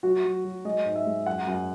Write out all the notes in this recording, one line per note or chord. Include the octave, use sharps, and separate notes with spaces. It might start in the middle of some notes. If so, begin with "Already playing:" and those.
F#3 F#4
F#3
F#3
G#3 D#5
G#2
E5
G#3
F#2 F#5
F#2